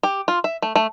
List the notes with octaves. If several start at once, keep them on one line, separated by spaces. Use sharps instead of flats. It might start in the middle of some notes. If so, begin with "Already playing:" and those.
G4
F4
E5
A3
A3